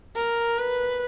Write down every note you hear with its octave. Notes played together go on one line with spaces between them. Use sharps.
A#4
B4